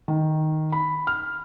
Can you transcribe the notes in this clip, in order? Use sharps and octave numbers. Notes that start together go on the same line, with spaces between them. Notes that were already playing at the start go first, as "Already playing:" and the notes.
D#3
B5
F6